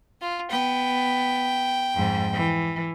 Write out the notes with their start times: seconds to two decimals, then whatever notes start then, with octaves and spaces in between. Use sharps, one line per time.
0.21 F4
0.51 B3 G5
1.94 F2 G#2
2.33 E3